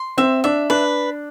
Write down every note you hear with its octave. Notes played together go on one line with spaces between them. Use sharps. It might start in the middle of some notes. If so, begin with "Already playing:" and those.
Already playing: C6
C4 E5
D4 E5
D4 B4